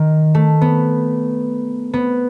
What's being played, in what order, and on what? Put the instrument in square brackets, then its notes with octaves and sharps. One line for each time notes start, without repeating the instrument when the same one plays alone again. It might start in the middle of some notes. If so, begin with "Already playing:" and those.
Already playing: [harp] D#3
A3
B3
B3